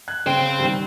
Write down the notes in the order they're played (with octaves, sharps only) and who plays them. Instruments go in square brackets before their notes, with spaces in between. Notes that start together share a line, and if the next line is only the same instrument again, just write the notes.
[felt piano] F#6 G#6
[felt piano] C#3 [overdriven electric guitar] C5 G5
[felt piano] D#3 G3